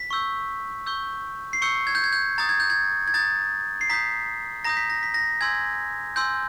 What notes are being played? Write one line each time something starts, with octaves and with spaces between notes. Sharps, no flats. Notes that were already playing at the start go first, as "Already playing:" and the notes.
Already playing: B6
C#6 E6 G6
C#6 E6 G6
C7
C#6 E6 G6 C#7
G#6
G6
G#6
G6
A#5 D#6 G6 A6
G#6
G6
G#6
G#6
A#5 D#6 G6 A6
C7
A#5 D#6 G6 B6
A#5 D#6 G6 A#6
B6
A#6
B6
A#6
G#5 C6 E6 G6 G#6
G#5 C6 E6 G6